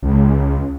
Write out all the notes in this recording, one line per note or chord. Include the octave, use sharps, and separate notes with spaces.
C#2